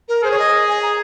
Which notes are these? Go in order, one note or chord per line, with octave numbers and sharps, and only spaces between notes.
A#4
G#4 C5
C#5
D#5
G#5
A#5